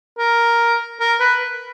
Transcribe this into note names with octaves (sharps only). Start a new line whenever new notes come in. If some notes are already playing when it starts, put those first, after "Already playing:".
A#4
A#4
B4